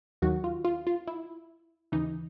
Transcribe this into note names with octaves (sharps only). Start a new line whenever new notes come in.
D#2 D#3 F#3 F#4
F4
F4
F4
E4
D#2 C#3 E3 D#4